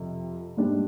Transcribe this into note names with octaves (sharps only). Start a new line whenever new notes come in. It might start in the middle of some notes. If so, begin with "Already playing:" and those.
Already playing: F2 C3
G#2 G3 D4